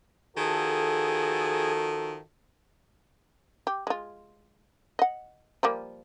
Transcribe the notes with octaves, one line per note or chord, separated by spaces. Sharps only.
D#3 F3 F#4 G#4 A4
G4
G#3 F4
D#5 F#5
F3 G3 A#3